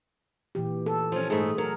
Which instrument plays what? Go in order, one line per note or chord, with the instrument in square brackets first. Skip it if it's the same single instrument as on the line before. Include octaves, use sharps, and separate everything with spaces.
[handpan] A#2 E3 G4
A4
[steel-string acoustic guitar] F3 C#4
[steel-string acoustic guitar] G#2 A3 [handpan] G#4
[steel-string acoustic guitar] F#3 [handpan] A#4